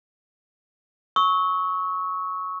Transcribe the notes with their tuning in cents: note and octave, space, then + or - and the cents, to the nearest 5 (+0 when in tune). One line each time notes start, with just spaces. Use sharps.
C#6 +0 E6 -40